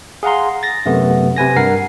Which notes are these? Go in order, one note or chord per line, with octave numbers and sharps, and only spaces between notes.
G#4 F5 F#5 A#5 C6
A6 A#6
F#2 C3 A3 B3
C3 B4 G#5 A#6
G2 A#4 F#5 C7